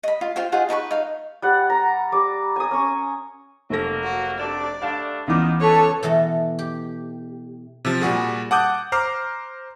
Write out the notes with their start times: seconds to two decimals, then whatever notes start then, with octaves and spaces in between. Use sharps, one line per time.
0.03 D#5 B5
0.21 F4
0.36 F4 C5 G5
0.52 D#4 F4 G#4 F#5
0.69 D#4 B4 B5 C#6
0.91 D#4 F5
1.42 G3 F#5
1.70 A#5
2.12 G3 D6
2.56 G#5 D#6
2.71 C#4 C#6
3.70 F1 F#3 A#3 A4 A#6
4.03 F#4
4.39 C3 A3 D4 D5
4.82 G3 A3 D4 F5
5.28 C#2 D#3 E3 B3 D6
5.60 A4 B4 C#5
6.03 B2 E3 A3 A4 D#5 A5
6.59 G4
7.85 C3 F3
8.01 A#2 G3 F#4 G#4
8.51 F#5 A5 D6 D#6 F#6 G6
8.92 C5 A#5 D6 F6 C7